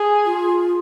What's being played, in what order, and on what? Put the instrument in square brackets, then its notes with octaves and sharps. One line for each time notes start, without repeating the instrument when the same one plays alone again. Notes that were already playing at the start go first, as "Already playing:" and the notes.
Already playing: [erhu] G#4
[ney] F4